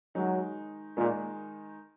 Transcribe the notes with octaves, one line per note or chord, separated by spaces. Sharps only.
D#3 F#3 G#3 D#4
A#2 D#3 G#3 D#4